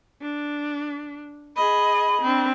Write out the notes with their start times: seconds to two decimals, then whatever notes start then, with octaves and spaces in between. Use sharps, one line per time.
0.22 D4
1.56 G#4 D#5 B5
2.22 C4 D4